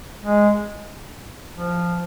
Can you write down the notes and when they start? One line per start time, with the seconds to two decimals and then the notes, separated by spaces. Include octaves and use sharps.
0.21 G#3
1.56 F3